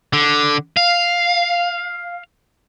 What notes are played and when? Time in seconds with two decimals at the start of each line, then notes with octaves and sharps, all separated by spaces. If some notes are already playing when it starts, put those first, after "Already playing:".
0.13 D3
0.77 F5